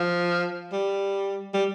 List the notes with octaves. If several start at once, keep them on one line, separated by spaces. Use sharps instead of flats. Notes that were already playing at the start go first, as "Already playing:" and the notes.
Already playing: F3
G3
G3